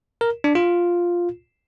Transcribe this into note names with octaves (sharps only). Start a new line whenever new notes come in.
A#4
D4
F4